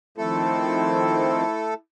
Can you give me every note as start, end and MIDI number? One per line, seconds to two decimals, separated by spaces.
0.18 1.43 51
0.18 1.43 53
0.18 1.74 57
0.18 1.43 60
0.18 1.80 64
0.18 1.74 69